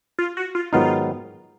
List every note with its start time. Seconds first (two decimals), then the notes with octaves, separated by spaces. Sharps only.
0.19 F4
0.37 F#4
0.55 F4
0.73 G#2 D#3 F#3 B3 D#4 F4